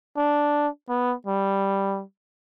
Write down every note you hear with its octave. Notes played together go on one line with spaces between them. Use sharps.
D4
B3
G3